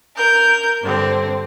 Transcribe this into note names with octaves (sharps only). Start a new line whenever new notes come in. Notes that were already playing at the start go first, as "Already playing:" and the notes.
A#4 G6
G2 D3 C4